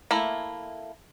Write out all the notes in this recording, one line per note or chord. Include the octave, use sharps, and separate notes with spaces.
A3 A#3 E4